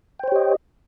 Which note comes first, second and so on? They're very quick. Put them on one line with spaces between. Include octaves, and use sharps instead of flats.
G5 C5 C#5 G4 D#5